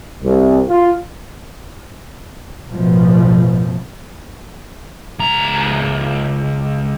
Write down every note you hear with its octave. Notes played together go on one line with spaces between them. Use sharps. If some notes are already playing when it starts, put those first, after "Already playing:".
C2
F4
A1 F#2 B2 F3
C#2 A#5